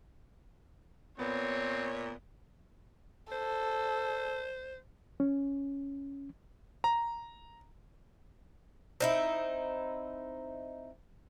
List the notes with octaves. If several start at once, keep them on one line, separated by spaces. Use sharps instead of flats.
A#2 B3 C4 C#5
A4 C5
C#4
A#5
C4 D#4 E4